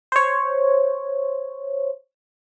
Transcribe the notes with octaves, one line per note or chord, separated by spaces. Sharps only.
C5 C#5